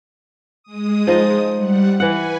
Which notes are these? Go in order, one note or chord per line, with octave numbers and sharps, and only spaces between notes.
G#3 D#6
F3 D#4 D#5
G3 F#5
E3 B4 F#5 G#5